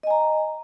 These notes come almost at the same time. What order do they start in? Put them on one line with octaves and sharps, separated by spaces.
D#5 G#5 A#5